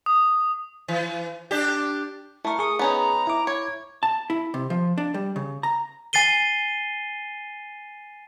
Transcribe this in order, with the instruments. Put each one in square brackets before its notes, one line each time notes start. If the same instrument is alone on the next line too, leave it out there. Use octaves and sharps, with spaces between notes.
[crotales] D#6
[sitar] E3
D4 G4
[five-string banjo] A3 A#4 [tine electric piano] E4 C#6
[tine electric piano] G#4 C#6 [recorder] D#6
[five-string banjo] B3 C#4 D#4 [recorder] A#5
[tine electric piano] E4 D6
[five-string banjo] C#5 [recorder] G#6
[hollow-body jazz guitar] A5
E4
C3
F3
D4
G3
C#3
A#5
[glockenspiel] G#5 A6 C7 D#7 G7